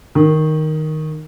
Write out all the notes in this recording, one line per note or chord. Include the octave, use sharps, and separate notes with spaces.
D#3